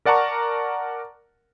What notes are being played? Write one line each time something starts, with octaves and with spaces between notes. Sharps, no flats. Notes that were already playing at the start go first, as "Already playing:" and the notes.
A#4 D5 F#5 A5 A#5 C#6